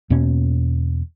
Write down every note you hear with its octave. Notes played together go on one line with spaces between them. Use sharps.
E2 B2 A#3 C#4